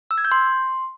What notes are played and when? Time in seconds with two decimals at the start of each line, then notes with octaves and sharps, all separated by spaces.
0.11 E6
0.18 G#6
0.25 G6
0.32 C6